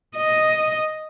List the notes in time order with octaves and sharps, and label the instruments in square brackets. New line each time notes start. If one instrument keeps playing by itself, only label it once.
[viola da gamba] D#5